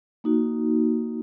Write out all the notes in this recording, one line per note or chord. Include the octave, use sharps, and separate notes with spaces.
A#3 D#4 F#4